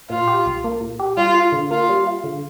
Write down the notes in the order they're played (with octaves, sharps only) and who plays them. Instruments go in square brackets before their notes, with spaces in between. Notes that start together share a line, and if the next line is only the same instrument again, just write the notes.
[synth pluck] A#2 [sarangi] F4
[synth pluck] G4
C2
A#3
A#2
G4
[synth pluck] G3 [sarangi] F4
[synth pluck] F4
D3
[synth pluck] A#3 [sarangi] F4
[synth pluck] G3
F4
D3